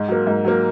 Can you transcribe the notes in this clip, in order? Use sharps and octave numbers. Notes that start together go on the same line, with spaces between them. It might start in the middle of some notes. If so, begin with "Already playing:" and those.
Already playing: G#2
F#3 A#3
G#2
F#3 A#3